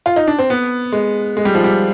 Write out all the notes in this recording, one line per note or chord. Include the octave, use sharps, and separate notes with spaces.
F4
D#4
D4
C4
B3
G#3
G#3
G3
F3
G3